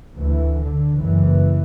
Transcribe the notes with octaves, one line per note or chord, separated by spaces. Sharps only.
D2 E3
D3
F#1 F#2 E3